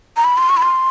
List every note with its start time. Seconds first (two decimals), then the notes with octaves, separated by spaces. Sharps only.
0.17 A#5
0.24 B5
0.37 C6
0.49 C#6
0.57 B5
0.62 C6